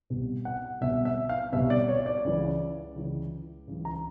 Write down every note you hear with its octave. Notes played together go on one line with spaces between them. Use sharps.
C2 B2
F#5
C2 B2 E5
E5
F5
C2 B2 E5
D5
C#5
D5
C#2 C#3 E3
C#2 C#3 E3
C#2 C#3 E3
A#5